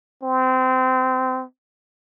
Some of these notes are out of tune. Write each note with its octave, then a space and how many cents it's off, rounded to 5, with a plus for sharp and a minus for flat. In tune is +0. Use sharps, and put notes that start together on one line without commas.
C4 -25